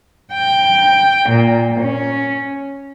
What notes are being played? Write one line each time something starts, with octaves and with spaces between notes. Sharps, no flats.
G5
A#2
C#4